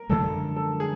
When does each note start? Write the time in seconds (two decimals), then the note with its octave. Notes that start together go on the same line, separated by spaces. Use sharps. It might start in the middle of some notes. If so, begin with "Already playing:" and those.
Already playing: A#4
0.09 F#2 D3 F3 G#3 A4
0.56 A4
0.80 G#4